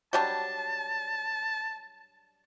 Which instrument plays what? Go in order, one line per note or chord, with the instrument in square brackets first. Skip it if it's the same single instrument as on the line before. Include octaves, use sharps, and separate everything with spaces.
[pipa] F#3 G3 D4 [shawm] A5